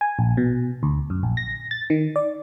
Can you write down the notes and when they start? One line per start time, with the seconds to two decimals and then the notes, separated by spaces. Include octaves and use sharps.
0.01 G#5
0.19 A#1
0.37 B2
0.83 D2
1.10 F#2
1.23 A#1
1.37 A#6
1.71 A6
1.90 D#3
2.16 D5